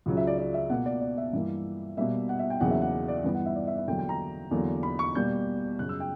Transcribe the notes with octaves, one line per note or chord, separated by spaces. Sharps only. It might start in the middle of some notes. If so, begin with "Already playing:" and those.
C#2 C#3 F#3
E5
D5
D5
E5
B2 A#3 F#5
D5
D5
E5
G2 E3 A#3
B2 G3 A#3 E5
F#5
E5
G5
E2 C#3 F#3 A#3 F#5
E5
F#5
D5
G2 E3 B3
F#5
E5
D5
E5
E5
E2 D3 F#3 A#3 G5
G5
A#5
E2 D3 F#3 A#3
B5
C#6
B2 G3 A#3 G6
F#2 C#3 F#3 F#6
E6
G5